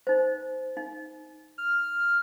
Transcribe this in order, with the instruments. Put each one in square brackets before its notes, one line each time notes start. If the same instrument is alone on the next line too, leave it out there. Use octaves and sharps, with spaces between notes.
[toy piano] D#4 C5
D#4
[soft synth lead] F6